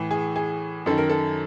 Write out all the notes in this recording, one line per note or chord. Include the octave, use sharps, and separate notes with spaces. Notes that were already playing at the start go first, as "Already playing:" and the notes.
Already playing: A2 E3
G#4
G#4
F#2 D#3 A4
A#4
A4